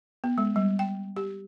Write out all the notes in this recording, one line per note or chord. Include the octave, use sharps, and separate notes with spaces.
B3
G#3
G3
G5
G4